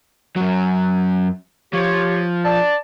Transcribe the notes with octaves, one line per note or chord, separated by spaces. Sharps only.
F#2 F#3
F3 F4 G4 C#5
D5 A5